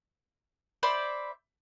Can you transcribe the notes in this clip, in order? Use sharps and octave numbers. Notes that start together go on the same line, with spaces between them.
C5 D5 E5 B5